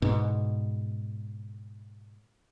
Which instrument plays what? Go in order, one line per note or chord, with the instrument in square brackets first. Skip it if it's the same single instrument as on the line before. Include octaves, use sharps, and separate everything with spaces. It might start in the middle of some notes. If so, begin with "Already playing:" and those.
[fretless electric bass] G#2 B2